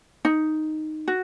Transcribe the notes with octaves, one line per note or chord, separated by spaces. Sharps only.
D#4
F#4